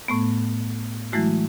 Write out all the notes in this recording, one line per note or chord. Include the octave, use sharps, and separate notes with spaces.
A2 A3 B3
E3 F#3 G#3 A3 E4 F#4